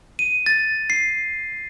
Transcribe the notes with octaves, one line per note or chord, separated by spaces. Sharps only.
D#7
A6
C7